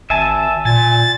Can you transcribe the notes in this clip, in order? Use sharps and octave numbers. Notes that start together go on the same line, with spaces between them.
G#1 E5 G#5 A5
A#2 G#5 A6